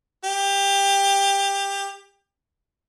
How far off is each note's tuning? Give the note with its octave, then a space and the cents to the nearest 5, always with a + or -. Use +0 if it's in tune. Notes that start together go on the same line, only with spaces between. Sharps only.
G4 +20